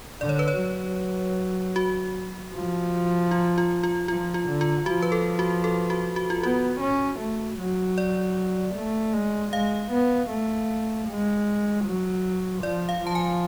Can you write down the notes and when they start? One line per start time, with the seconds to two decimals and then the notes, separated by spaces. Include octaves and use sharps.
0.21 D3 D5
0.29 C#5
0.39 B4
0.48 C#5
0.60 F#3
1.76 F#4
2.53 F3
3.31 F4
3.58 F4
3.83 F4
4.08 F3 F4
4.34 F4
4.48 D3
4.61 F4
4.86 F3 F#4
5.02 B4
5.12 A4
5.39 F#4
5.64 A4
5.90 F#4
6.16 F#4
6.30 F4
6.41 B3 F#4
6.80 C#4
7.19 A3
7.58 F#3
7.98 D5
8.75 A3
9.13 G#3
9.52 G#3 F5
9.91 B3
10.30 A3
11.08 G#3
11.85 F#3
12.63 F3 D5
12.89 F5
13.02 F3 A5
13.15 G#5